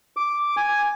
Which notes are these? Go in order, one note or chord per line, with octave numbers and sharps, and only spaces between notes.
D6
G#5